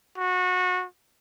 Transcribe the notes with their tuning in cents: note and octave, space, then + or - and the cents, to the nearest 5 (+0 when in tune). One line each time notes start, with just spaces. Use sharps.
F#4 -25